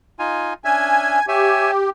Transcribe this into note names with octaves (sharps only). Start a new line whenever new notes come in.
D#4 F4 G#5
C#4 D4 E5 G#5
G4 C#5 E5 G#5